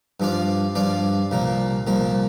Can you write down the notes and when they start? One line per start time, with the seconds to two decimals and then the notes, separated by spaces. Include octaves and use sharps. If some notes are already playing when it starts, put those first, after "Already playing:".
0.20 G2 F3 D4 F4 D5
0.75 G2 F3 D4 F4 D5
1.31 C2 A#2 F3 A#3
1.87 C2 A#2 F3 A#3